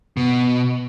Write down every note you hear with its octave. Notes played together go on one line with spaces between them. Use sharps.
B2